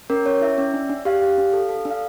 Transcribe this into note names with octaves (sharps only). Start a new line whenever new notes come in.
C#4 A#4
C#4 C#5
E4 E5
C#4
D4
D4
G4 F5
G4
D4
A4
A4
D4
F5